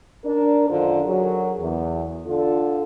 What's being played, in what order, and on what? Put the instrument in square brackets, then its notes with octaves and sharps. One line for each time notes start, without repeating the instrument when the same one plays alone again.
[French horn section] D4 A#4
F#2 D3 D#3 F4 A4 C5
F#3 G#4 A#4
E2
D3 F4 A4